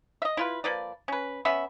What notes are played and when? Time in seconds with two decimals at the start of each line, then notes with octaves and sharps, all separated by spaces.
0.22 D#5 E5
0.37 E4 F4 B4
0.64 F3 A#3 B4 D5
1.08 C#4 B4
1.45 B3 C#4 E5 B5